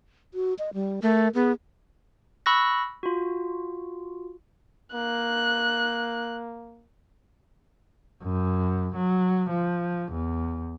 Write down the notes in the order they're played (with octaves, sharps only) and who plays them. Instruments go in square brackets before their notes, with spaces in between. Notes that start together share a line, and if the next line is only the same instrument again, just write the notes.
[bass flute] F#4
D#5
G3
[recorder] A3 [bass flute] A#4
[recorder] B3 [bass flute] G#4
[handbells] B5 C#6 E6 F#6 A#6
F4 F#4
[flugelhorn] A#3 [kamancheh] F#6
[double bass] F#2
F#3
F3
E2